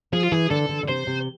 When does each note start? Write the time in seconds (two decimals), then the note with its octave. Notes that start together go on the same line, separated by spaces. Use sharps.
0.13 F3 G#4
0.23 F4
0.32 E3 G#4
0.50 D3 A4
0.69 D3
0.83 D3
0.88 C3 C5
1.07 C3